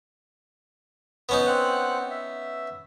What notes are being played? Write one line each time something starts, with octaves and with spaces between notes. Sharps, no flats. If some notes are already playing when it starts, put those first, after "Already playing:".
B3 C#4 D#4
C4 F#5 F#6
E5